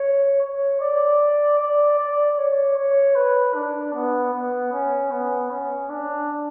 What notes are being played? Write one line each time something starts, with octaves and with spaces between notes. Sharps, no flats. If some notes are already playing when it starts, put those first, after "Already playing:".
Already playing: C#5
C#5
D5
D5
D5
C#5
C#5
B4
D4
B3
B3
C#4
B3
C#4
D4